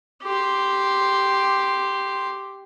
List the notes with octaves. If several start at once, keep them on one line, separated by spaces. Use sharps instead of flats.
G4 C6